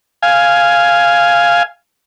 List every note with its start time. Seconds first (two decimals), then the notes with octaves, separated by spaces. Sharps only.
0.22 F5 G#5